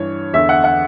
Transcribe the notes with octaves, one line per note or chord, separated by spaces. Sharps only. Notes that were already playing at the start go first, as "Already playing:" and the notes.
Already playing: G2 E3 C#5
E2 D3 E5
F#5
F#5